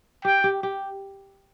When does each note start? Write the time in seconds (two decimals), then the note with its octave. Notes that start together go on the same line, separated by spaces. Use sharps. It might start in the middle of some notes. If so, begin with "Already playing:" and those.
0.25 G4 G5
0.44 G4
0.63 G4